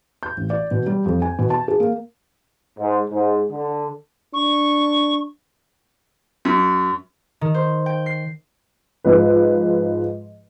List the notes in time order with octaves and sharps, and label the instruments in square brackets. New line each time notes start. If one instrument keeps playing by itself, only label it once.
[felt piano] G6
A1
D5
B2
G3
F2
G#5
B2
A5
G#4
A#3
[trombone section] G#2
G#2
D3
[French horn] D4 [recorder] C#6
[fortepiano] F#2
[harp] D#3
C5
G5
C7
[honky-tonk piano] G#2 F3 B4